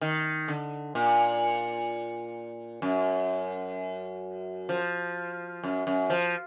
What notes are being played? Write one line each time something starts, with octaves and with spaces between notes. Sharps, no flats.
D#3
D3
A#2
F#2
F3
F#2
F#2
F3